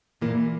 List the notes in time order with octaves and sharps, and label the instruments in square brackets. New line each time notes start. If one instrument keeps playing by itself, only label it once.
[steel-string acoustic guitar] A#2 A#3 [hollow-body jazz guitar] E3